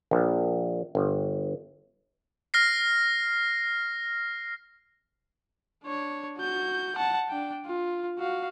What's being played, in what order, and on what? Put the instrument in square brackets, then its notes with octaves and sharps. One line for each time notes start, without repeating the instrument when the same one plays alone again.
[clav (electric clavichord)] A#1
G1
[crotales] F6 A#6 C7
[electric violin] D4 C#5
F#4 G6
F#5 A5
D4 G5
F4
F#4 F5